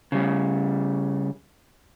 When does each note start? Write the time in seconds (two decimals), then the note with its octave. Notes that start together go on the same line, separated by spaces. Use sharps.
0.12 C#3 G3